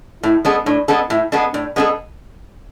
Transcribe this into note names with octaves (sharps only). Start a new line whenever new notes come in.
A2 E4
G#3 B3 D4 A4
A2 D4
G#3 B3 D4 A4
A2 E4
G#3 B3 D4 A4
A2 D4
G#3 B3 D4 A4